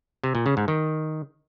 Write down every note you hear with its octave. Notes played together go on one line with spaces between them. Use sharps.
C3
A#2
C#3
G#2
D#3